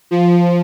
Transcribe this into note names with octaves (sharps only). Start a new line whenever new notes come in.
F3